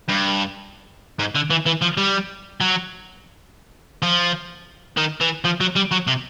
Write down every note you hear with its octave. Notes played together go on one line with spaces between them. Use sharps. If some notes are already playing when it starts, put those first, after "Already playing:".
G2
G#2
D3
E3
E3
F3
G3
F#3
F3
D#3
E3
F3
F#3
G3
F#3
C3